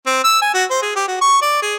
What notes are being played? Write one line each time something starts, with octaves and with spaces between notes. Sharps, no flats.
C4
E6
G#5
F#4
C5
G#4
G4
F#4
C#6
D5
G#4